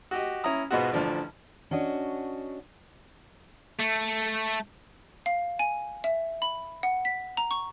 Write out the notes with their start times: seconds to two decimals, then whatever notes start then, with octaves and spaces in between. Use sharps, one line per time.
0.11 F#4 G4 D#5
0.44 C#4 E4 A#5 D#6
0.71 G#2 B2 G#3 B3 F4 F#4
0.93 A1 D3 F3 D5
1.71 C#4 D4 F#4 D#5
3.80 A3
5.26 F5
5.59 G#5
6.04 E5
6.42 B5
6.83 F#5
7.05 B6
7.37 A#5
7.51 C#6